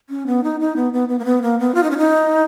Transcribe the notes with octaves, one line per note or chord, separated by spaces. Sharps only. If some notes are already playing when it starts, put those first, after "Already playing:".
C#4
B3
D#4
D#4
B3
B3
B3
A#3
B3
A#3
B3
F4
D#4
C#4
D#4